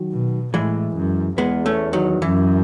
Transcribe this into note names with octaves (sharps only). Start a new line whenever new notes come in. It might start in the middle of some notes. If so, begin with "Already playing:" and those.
Already playing: D#3 F#3
B2
A2 E3 G#3
F#2
E2 G#3 B3
A3 C#4
D#3 F#3
F#2 E3